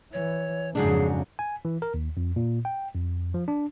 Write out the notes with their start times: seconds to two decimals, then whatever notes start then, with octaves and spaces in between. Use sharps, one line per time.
0.13 E3 C#5
0.75 F2 G#2 C#3 F#3 D4 G#4
1.39 G#5
1.65 E3
1.82 A#4
1.94 D#2
2.17 F2
2.36 A#2
2.65 G5
2.94 F2
3.34 F3
3.48 D4